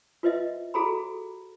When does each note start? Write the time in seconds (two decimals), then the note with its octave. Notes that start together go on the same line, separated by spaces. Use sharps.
0.23 F4 B4 C5 D#5 E5
0.74 F#4 G#4 A4 C5 A#5 B5